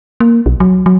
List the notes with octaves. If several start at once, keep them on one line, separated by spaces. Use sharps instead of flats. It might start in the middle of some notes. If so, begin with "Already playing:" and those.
A#3
B1
F#3
F#3